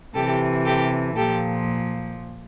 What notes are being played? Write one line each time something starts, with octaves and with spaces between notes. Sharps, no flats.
C3 E3 G4 A4
G4 A4
A#2 F3 G4 A4